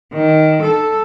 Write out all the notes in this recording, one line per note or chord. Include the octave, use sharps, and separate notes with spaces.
D#3
A4